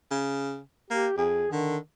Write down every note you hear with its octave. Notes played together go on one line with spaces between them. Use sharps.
C#3
A#3 G4
F2 G#4
D3 D#3